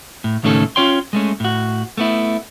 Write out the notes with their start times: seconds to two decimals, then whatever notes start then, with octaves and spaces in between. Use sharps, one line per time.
0.24 A2
0.43 C#2 A2 D#3 A3 C#4 A4
0.76 C#4 F4 C#5 G5 C6
1.13 G#3 A3 C#4
1.40 A2 F#4
1.98 A3 B3 E4